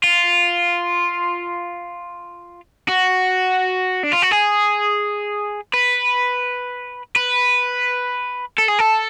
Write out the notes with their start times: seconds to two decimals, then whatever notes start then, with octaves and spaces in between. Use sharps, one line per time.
0.03 F4
2.89 F#4
4.03 D4
4.13 F4
4.22 F#4
4.31 G#4
5.74 B4
7.16 B4
8.59 A4
8.69 G#4
8.80 A4